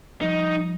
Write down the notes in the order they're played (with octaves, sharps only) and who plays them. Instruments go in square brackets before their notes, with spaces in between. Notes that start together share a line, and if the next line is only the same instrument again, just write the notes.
[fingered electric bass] F3 G3 [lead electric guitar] D#4